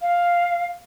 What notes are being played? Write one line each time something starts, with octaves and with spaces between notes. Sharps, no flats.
F5